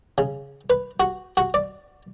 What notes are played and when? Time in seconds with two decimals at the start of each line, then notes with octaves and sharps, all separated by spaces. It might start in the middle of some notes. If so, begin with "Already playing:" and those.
0.18 C#3
0.70 B4
1.00 F#4
1.37 F#4
1.54 D5